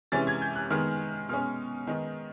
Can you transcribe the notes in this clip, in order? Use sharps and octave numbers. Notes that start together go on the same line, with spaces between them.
C3 E3 G#3 C#4 A6
G#6
G6
F#6
D#3 G#3 B3 F6
B2 G#3 C#4 F6
D#3 G#3 B3 D#4